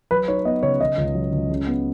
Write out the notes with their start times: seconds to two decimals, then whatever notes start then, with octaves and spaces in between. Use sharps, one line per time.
0.11 F#3 B4
0.28 D#4 C#5
0.45 B3 D#5
0.63 C#3 C#5
0.80 C#3 D#5
0.97 C#2
1.15 F#3
1.32 C#2
1.50 C#3
1.67 B3